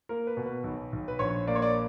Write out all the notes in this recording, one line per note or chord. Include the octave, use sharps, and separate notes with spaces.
A#3 A#4
B4
B2
B4
B1
B1
B4
A#1 C#5
A#3 D5
C#5
D5